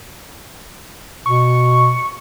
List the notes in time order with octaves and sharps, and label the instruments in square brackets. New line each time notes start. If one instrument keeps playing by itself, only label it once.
[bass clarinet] B2 [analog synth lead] C#6